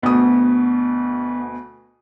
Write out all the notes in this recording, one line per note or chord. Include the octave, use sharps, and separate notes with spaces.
D2 B2 B3 D#6